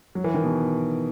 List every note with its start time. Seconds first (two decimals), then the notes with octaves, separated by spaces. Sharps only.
0.15 F#3
0.24 E3
0.34 D#3
0.44 B2